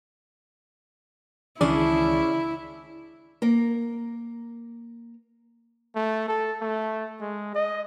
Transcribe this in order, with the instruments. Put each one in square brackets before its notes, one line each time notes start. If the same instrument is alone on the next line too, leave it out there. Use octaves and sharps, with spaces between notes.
[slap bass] C#2 D#3 E3 [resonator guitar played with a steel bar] C#4 D4 G#4 [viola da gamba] E4 [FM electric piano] D5
[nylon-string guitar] A#3 A#4
[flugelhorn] A3
A4
A3
G#3
D#5